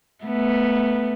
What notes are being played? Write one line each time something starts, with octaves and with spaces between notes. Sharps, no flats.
A3 B3